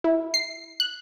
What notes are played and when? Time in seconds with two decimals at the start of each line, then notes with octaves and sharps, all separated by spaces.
0.04 E4
0.34 C7
0.80 F#6